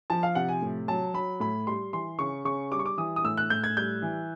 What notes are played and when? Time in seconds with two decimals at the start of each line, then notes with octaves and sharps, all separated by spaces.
0.10 F3 A5
0.23 F5
0.35 C3 F#5
0.49 G#5
0.62 A2
0.88 F#3 A5
1.14 F#3 B5
1.40 A2 B5
1.67 G3 C6
1.93 E3 C6
2.19 C#3 C#6
2.45 C#3 C#6
2.71 G3 D6
2.79 C#6
2.86 D6
2.97 E3 D#6
3.16 D#6
3.24 A2 E6
3.37 F#6
3.50 A2 G6
3.64 G#6
3.77 G3 G6
4.02 E3